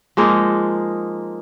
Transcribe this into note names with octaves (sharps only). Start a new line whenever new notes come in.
F3 G#3 A#3 D#4